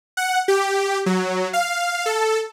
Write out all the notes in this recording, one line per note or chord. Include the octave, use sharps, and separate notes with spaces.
F#5
G4
F#3
F5
A4